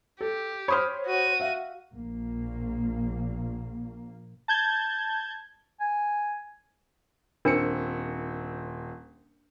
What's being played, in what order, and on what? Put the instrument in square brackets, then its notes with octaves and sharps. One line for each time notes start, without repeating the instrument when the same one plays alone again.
[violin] G4 [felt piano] A4
[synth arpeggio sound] C5 C#5 [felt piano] B5 D#6 F6
[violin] F#4 D#7
[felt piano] E5 F5
[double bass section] A#1 A#3
[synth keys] A5 G6 G#6
[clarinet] G#5
[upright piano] D#1 C4 C#7 [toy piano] D4 A#4